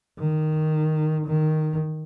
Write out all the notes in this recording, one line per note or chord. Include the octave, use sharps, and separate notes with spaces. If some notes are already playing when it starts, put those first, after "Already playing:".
D#3
D#3